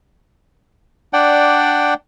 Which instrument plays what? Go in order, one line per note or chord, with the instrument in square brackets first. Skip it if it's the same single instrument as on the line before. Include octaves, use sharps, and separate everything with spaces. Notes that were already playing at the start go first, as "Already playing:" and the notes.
[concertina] D4 D5 F#5 G5